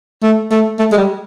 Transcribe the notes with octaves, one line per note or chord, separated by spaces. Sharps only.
A3
A3
A3
G#3
G3